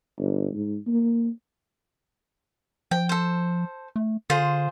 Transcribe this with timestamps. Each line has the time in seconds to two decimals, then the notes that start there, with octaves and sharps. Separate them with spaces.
0.18 G1
0.53 G#2
0.87 A#3
2.91 F3 G5
3.09 A4 C5
3.96 A3
4.30 D3 F4 G#4 C5